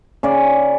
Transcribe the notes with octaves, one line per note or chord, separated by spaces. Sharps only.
C#3 D5